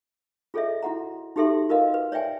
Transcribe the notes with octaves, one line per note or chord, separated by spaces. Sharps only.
F4 G#4 A4 C#5 D#5 E5
E4 F#4 F#5 A#5
D#4 F#4 G4 A4 E5 C6
F4 F#4 A#4 B4 D#5 F5
B4
C#5 D5 E5 G5 G#5